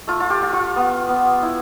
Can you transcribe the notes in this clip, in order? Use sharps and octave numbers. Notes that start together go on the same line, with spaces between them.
A3 F4
F4
G4
F4
F4
B3
B3
E4